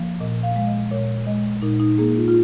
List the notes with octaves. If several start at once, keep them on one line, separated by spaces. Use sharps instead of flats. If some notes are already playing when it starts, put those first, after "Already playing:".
Already playing: F3 A#3
A#2 D#5
F5
G#3 F5
D#5
A#2 C#5
G#3 D#5
A#2 D#4
D#4
A#3 G#4
F4
F4